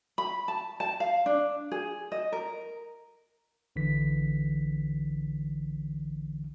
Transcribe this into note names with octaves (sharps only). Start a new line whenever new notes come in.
B5
A5
A5
F5
D4
G#4
D#5
A#4
A#1 D3 E3 B6